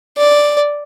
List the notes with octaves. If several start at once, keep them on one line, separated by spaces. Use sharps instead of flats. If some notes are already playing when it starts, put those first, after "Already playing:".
D5